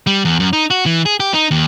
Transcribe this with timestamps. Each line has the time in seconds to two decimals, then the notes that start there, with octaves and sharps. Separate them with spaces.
0.07 G3
0.25 E2
0.40 F#2
0.53 D#4
0.70 F#4
0.86 E3
1.06 G#4
1.20 G4
1.34 D#4
1.51 D#2